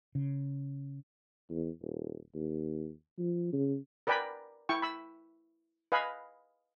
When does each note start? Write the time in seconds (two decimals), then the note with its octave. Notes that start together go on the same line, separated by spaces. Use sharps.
0.15 C#3
1.50 E2
1.82 D#1
2.35 D#2
3.18 F3
3.53 C#3
4.07 A#4 B4 D5 G5 G#5 B5
4.69 E4 G5 C#6
4.82 B5 E6
5.92 B4 D#5 F5 G#5 B5